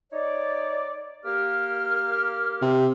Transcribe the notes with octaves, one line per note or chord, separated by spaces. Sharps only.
D#4 C#5 D5
A#3 G4 F6
C3